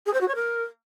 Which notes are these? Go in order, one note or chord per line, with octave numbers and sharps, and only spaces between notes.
G#4
C5
F#4
C#5
A#4